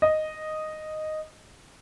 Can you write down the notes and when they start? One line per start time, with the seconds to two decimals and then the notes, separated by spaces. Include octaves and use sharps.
0.02 D#5